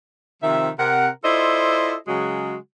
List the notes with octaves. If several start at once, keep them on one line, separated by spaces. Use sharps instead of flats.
C3 D#3 F3 E5
C3 A#4 F#5
E4 F4 A4 C5 D5 D#5
C#3 F#3 G#3 F#4